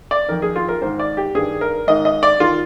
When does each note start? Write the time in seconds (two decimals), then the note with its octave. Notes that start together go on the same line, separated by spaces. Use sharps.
0.11 D5
0.29 F2 D#3 A#4
0.42 G#4
0.56 F4
0.69 A#4
0.82 G#2 D#3 C5
0.99 D5
1.17 G4
1.35 G2 D#3 G#4
1.61 A#4
1.87 G#2 D#3 D#5
2.05 D#5
2.23 D5
2.40 D#3 F4